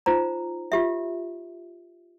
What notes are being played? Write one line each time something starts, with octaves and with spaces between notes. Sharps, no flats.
D#4 F4 C5 A#5
F4 G4 E5